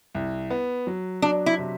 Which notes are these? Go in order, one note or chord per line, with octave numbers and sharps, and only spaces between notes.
C2
B3
F#3
F#3 D4
E4
C3